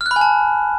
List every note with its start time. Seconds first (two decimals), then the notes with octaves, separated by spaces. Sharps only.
0.01 F6
0.06 F#6
0.11 B5
0.16 G#5
0.21 A5